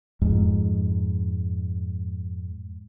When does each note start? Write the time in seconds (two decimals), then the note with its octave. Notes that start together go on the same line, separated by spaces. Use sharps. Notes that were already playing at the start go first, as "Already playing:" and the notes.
0.22 F2 G#2